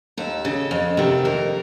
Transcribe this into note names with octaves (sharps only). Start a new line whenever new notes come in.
D#2 A4
C#3
F2
C3 D#3
F2 A#4